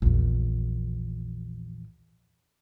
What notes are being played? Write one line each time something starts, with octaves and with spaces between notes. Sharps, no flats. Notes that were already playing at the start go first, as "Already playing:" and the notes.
A#1 E2